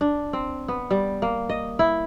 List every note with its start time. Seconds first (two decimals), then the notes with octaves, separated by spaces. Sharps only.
0.01 D4
0.33 C4
0.68 B3
0.91 G3
1.22 A#3
1.49 D#5
1.79 E4